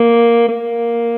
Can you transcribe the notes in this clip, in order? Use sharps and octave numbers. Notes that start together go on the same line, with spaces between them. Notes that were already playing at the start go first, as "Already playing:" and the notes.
Already playing: A#3
A#3